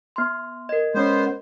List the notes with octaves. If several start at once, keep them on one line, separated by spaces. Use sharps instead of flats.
B3 C6
A#4 D#5
G#3 B3 C#4 C5